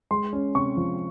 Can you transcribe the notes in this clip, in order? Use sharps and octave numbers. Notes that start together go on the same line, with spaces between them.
G#3 C6
C#4
C3 C#6
F3